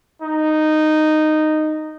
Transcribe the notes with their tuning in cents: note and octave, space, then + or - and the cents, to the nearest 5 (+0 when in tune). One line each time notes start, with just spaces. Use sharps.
D#4 -10